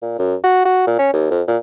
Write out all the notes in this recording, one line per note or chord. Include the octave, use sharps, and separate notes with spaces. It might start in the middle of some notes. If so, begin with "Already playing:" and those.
A#2
F#2
F#4
F#4
A#2
C#4
D#2
F2
A#2